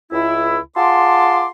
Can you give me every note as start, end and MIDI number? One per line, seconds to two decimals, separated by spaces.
0.12 0.57 37
0.12 0.57 64
0.77 1.48 65
0.77 1.48 68
0.77 1.48 78
0.77 1.48 81
0.77 1.48 84
0.77 1.48 86